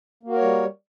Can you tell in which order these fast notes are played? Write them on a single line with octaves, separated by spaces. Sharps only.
A#3 F#4 A#4 C#5 G3